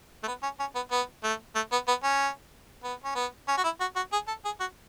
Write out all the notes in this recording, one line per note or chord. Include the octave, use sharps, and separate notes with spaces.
A3
B3
C#4
C#4
B3
B3
A3
A3
B3
B3
C#4
B3
C#4
B3
C#4
F#4
E4
F#4
F#4
G#4
A4
G#4
F#4